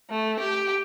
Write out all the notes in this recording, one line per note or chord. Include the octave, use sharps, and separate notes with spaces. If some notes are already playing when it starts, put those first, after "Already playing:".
A3
G4